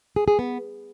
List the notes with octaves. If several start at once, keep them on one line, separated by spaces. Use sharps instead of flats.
G#4
G#4
B3